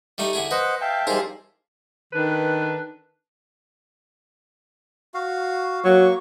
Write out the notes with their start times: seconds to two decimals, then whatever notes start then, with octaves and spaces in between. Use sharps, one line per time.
0.18 G3 A3 D#4
0.33 D3 E4 G#4
0.51 B4 C5 D#5 F#5
0.81 E5 F5 G5 A5
1.07 G3 D#4 G#4 A#4 C5
2.13 D#3 D4 A4 B4
5.14 F#4 F5
5.85 F#3 A#3 C#6